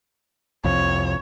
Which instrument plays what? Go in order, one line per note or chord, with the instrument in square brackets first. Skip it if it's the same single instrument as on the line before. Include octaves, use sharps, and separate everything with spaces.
[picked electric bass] C2 F2 [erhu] C#5